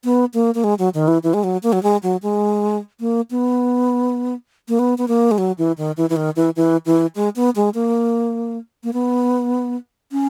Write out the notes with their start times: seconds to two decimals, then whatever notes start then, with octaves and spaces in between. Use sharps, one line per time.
0.04 B3
0.34 A#3
0.55 A#3
0.64 G#3
0.79 F#3
0.94 D#3
1.08 E3
1.23 E3
1.34 G#3
1.44 F#3
1.63 A#3
1.73 F#3
1.83 G#3
2.03 F#3
2.23 G#3
3.00 A#3
3.31 B3
4.68 A#3
4.79 B3
4.98 B3
5.08 A#3
5.31 G#3
5.38 F#3
5.58 E3
5.78 D#3
5.97 E3
6.10 E3
6.16 D#3
6.36 E3
6.56 E3
6.86 E3
7.15 G#3
7.36 B3
7.56 G#3
7.74 A#3
8.84 A#3
8.93 B3
10.12 C#4